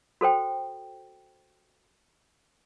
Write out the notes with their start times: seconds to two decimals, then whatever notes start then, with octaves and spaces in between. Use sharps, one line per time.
0.21 F#4 A4 C5 G5